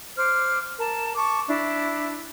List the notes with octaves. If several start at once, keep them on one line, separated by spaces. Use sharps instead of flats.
C5 D6 F6
A#4 A5
A5 C#6 D6
D4 E4